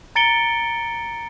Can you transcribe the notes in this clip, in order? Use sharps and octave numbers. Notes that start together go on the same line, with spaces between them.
A#5 A6 C#7 D7 G7